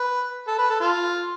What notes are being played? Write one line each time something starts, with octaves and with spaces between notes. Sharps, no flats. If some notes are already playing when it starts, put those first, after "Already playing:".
Already playing: B4
A4
B4
A4
F4